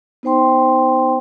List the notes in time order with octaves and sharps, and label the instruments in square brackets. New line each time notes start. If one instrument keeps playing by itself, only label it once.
[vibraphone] B3 D#4 C5 G5 C6